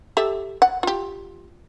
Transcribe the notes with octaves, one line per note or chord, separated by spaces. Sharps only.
G4 A4 E5
F#5
F4 G4